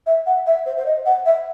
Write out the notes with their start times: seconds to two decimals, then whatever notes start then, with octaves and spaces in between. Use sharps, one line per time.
0.06 E5
0.26 F#5
0.46 E5
0.66 C5
0.77 C5
0.86 D#5
1.06 F#5
1.26 E5